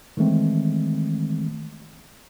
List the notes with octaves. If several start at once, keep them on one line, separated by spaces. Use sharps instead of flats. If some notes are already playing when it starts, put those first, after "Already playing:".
D#3 E3 G#3 A3 C4